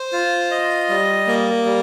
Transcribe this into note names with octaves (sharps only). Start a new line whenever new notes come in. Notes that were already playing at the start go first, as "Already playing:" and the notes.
Already playing: C5
F4
D#5
G3
A#3
G3